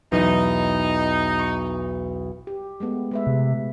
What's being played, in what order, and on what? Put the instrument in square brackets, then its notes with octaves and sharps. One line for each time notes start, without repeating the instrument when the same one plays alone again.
[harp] B1 E2 [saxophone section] D#4
[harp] C#6 C#7
[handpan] G4
G#3 A3 B3
G#3 B4 E5
[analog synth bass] C3